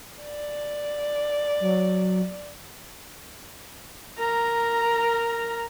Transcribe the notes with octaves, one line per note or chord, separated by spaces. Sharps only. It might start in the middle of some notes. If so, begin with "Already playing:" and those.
D5
F#3
A#4 A#5